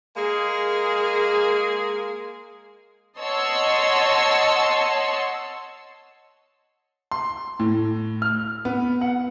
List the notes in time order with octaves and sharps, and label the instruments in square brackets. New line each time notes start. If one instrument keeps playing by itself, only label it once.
[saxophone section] G#3 A#3 G#4 A#4
[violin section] C#5 D#5 F#5 A5 C6 E6
[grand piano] C6
A2
F6
B3
F#5